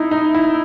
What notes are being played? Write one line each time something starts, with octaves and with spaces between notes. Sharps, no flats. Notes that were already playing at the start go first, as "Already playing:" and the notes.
Already playing: D#4 E4
D#4
E4